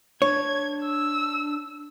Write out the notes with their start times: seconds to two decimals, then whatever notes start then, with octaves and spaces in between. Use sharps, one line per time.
0.22 D4 C#5 G#6
0.83 E6